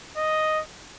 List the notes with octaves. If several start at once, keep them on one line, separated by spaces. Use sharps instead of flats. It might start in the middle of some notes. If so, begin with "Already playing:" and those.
D#5